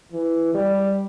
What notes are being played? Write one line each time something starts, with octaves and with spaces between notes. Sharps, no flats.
E3
G3